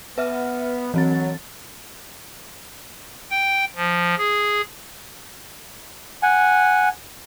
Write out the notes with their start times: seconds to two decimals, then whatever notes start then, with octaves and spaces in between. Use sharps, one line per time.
0.18 B3 B4 E5 F6
0.94 E3 F#3 C4 A6
3.31 G5
3.76 F3
4.18 G#4
6.23 F#5 G#5